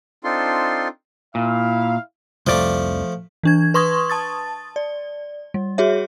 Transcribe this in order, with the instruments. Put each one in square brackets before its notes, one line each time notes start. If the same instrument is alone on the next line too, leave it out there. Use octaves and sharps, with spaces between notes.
[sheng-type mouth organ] C4 D4 D#4 F4 A4 C6
[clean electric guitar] A#2 [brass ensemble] E4 E5 F5
[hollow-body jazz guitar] C2 F2 D5 [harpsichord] F3 A3
[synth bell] E3 D4 G#6
B4 C6 C#6 D#6 G#6
A5 D#6 A6
D5
G3
F#4 G#4 C#5 E5